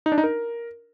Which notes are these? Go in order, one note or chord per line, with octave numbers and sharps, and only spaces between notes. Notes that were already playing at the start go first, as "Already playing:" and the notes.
D#4
D4
D#4
A#4